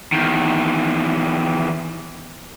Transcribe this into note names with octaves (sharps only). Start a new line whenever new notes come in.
E2 D#3